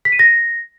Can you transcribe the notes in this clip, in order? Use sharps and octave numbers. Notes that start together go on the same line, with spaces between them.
B6
D#7
A#6